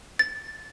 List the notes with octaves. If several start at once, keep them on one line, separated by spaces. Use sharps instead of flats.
A6